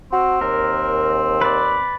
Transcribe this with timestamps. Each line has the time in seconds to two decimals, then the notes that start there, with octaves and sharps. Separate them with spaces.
0.13 C4 F#4
0.41 D#2 A#4
1.41 B4 D5